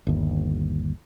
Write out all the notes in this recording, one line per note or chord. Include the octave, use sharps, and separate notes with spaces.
G1 D#2